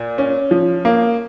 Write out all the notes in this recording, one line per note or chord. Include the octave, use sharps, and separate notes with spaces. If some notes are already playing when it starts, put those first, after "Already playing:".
Already playing: A#2
C#4
F3
A#3